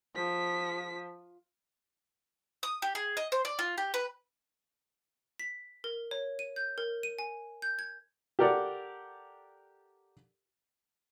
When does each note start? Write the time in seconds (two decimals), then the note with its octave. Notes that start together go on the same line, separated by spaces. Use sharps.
0.16 F3 B6
2.63 D#6
2.82 G4
2.95 G#4
3.17 D#5
3.32 C5
3.45 D5
3.59 F4
3.78 G4
3.94 B4
5.39 B6
5.84 A#4
6.11 C#5
6.39 D#7
6.56 G6
6.78 A#4
7.03 D#7
7.19 G#5
7.62 G6
7.79 G#6
8.39 G4 A4 A#4 D5 F#5